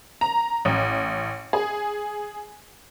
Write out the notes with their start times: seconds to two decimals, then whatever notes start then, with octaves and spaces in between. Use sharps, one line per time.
0.21 A#5
0.65 A1
1.53 G#4